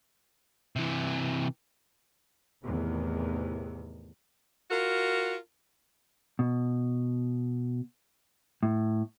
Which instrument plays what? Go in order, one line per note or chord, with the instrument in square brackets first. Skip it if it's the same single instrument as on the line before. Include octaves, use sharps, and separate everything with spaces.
[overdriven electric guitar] C3 E3
[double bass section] E2 A2 C3 D#3
[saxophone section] F4 F#4 A#4
[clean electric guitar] B2
A2